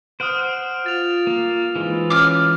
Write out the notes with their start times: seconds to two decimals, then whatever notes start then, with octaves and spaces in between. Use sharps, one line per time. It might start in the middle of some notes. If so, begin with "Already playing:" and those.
0.20 C5 F#5 D#6 F6 D7
0.86 F4 A6 F7
1.27 A#3
1.76 G#2 E3 G#3 F4
2.10 C#4 D6 F6